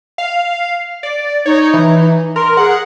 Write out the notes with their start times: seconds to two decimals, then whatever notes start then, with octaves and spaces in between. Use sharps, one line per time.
0.18 F5
1.03 D5
1.46 D#4 C#5
1.73 E3
2.36 A#4 C6
2.57 G#4 F#5